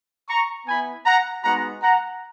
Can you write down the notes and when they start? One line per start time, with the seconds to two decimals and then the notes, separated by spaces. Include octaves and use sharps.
0.29 A#5 C#6
0.67 B3 E4 G#5 B5
1.06 F#5 A#5
1.44 G#3 B3 D#4 F#4 F#5 A#5
1.83 F#5 A#5